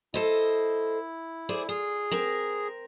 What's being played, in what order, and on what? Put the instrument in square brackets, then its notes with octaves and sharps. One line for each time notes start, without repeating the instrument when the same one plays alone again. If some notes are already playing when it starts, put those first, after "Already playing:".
[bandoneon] E4 [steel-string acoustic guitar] A4 C5 D#5
[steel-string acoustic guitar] G#4 C5 D5
[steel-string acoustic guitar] F4 [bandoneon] G#4
[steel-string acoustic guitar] C4 A#4